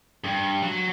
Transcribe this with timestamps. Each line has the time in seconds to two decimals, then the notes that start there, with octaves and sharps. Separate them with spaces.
0.24 G2
0.63 F#3